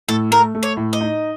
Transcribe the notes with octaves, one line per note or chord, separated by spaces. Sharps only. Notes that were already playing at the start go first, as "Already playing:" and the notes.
A2 A4
A3 A#4
A3
C#5
A2
D#5
D#4